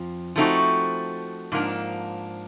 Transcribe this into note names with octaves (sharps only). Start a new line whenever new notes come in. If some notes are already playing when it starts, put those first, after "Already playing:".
Already playing: F2 F3
F3 A3 C4 D#4 F#4
G#2 F3 A#3 D4